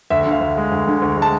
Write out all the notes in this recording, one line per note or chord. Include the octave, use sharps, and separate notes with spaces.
D2 E5
D3 E5
F5
D2
G#3
D2
D3
D2
G#3 A5